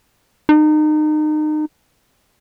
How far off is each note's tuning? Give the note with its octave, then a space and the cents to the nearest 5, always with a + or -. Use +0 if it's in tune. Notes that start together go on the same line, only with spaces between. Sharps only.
D#4 -30